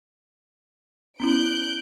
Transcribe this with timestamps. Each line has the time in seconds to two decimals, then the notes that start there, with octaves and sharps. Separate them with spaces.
1.20 B3 C#4 E4 F#6 G6 D7